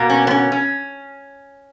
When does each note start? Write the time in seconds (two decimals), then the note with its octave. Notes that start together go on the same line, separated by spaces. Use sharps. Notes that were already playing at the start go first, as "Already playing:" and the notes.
Already playing: B2 A#3
0.10 C#4
0.27 B3
0.31 C#4
0.52 C#4